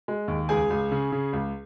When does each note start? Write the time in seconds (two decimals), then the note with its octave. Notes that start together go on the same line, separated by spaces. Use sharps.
0.08 G#3
0.28 D#2
0.49 C#2 G#4 G#5
0.70 C#2
0.92 C#3
1.12 C#3
1.33 C#2